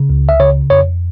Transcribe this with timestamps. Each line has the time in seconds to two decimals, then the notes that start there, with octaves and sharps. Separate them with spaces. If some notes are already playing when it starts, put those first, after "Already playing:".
Already playing: C#3
0.10 C#2
0.29 E5
0.40 C#3 C#5
0.70 F2 C#5